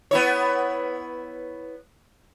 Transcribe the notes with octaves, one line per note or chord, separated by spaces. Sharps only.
B3 E4 C#5